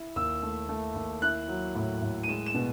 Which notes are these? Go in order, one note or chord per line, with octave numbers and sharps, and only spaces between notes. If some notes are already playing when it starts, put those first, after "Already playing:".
Already playing: E4
D#2 E6
A3
A3
D#2
E4 F#6
F#3
A2
A2
D#7
G#3 E7
E7
B2